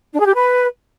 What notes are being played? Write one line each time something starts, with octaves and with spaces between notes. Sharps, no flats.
D4
G#4
G4
B4